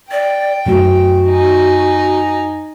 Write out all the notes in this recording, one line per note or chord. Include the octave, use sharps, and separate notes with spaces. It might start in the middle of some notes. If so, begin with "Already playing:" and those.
D5 G5
F#2 A3 F#4
D#4 G#5